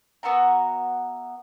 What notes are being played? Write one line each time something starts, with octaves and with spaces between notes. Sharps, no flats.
B3 F#4 E5 A#5